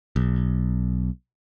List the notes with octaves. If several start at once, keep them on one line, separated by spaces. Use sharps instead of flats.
B1